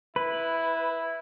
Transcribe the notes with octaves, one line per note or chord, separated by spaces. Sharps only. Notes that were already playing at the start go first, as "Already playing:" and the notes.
E4 B4